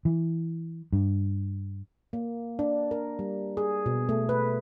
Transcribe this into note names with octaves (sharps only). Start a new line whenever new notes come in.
E3
G2
A#3
D4
A#4
G3
G#4
B2
A3
B4